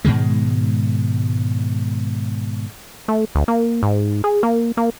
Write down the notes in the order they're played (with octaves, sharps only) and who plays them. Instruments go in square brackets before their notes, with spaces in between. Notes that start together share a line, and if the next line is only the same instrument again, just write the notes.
[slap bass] G#2 B2 D#3 G#3
[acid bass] A3
D2
A#3
G#2
G#4
A#3
A#3